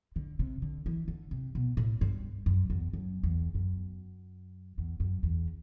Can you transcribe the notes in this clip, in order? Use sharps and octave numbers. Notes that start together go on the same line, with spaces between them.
D3
C3
D3
E3
D3
C3
B2
A2
G2
F#2
E2
F#2
E2
F#2
E2
F#2
E2